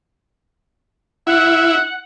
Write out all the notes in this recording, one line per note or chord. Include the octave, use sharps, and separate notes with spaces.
E4 F#5